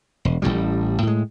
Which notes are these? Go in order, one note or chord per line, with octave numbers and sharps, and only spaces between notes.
E1
A1 F#2 A2 G3
A2 G#3